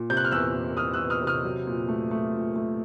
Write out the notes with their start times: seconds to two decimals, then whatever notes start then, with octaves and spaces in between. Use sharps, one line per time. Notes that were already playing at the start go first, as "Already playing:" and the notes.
Already playing: A#2
0.10 C3 G6
0.17 F#6
0.24 F6
0.31 E2 E6 F#6
0.55 E2
0.77 E3 D#6 F6
0.93 E6 F#6
0.99 E2
1.10 D#6 F6
1.22 C3 D#6 F6
1.44 F#3
1.67 A#2
1.89 A3
2.11 A3
2.33 A#2
2.56 A3